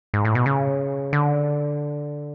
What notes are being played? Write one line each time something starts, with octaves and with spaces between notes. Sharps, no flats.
G#2
A2
B2
C#3
D3